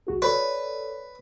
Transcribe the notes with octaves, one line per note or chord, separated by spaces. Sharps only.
B1 F#4 G#4
A4 B4 C#5 D5